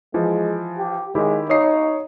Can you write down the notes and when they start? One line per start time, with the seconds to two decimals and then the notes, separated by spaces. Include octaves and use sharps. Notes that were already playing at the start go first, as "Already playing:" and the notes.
0.14 E3 F3 G#3
0.78 G4
1.15 D#3 G#3 E4 G4
1.50 D#4 C#5 D#6 C7